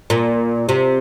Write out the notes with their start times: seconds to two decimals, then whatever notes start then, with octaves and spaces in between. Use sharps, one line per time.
0.10 A#2
0.69 C3